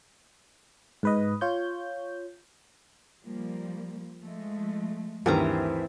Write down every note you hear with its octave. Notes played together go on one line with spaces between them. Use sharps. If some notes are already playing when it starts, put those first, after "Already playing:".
G#2 B4 D#5
F4 C#5 G6
F3 G3 A#3
F3 G#3 A3
D2 G2 D#3 E3 C4 G#4 E5 A#5